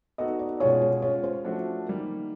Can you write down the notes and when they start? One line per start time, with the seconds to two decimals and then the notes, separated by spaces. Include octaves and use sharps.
0.18 B3 D#4 F#4 A4 D#5
0.39 D5
0.60 B2 G#3 C#4 F4 G#4 C#5
0.82 C#5
1.02 G#3 C#4 F4 C#5
1.24 C5
1.44 F3 A3 D4 F#4
1.86 D#3 G3 A#3